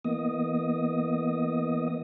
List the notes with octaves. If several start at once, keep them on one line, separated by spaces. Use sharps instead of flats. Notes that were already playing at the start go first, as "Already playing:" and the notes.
E3 A#3 B3 D#5 D#6